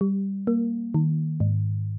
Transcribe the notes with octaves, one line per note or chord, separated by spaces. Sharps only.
G3
A#3
D#3
G#2